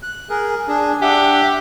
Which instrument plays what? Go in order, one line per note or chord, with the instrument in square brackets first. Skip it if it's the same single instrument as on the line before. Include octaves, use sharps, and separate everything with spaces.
[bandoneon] F#6
G#4 A#4
D4 G#4
[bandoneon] D4 E5 F#5 [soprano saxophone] G4